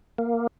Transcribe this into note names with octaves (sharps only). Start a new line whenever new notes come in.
A#3